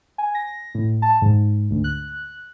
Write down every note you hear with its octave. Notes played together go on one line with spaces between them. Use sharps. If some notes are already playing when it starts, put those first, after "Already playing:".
G#5
A#6
A2
A5
G#2
D2
F#6